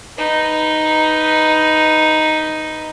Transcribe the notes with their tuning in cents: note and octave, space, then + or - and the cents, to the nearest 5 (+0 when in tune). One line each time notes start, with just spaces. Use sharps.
D#4 +0 B4 +0